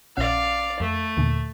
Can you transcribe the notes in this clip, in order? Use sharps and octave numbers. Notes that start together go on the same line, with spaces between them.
A#1 C#4 D5 F5 F#5
F2 A3
D#2 A#2 D3